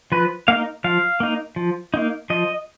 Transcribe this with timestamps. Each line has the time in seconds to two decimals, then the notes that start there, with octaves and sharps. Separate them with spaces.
0.12 F3 B4
0.48 A#3 D#4 F5
0.84 F3 F5
1.20 A#3 D#4
1.56 F3
1.94 A#3 D#4
2.30 F3 D#5